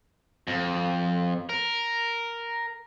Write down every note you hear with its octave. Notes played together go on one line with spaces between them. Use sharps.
F2
A#4